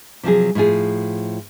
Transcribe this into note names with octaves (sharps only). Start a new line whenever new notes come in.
C3 F3 F#3 G#4
A2 F3 F4 G#4